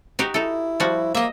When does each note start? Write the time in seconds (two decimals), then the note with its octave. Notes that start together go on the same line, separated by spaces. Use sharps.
0.19 D#4 F#4 G4
0.34 D#4 E4 A4
0.80 F3 G3 F#4
1.15 A#3 D#5 E5